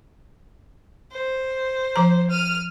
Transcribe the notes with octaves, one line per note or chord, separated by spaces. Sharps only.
C5
F3 A#5
F6 D#7